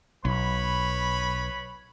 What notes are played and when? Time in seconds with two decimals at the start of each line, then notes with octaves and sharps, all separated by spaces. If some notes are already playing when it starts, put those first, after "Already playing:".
0.25 B1 B4 C#5 B5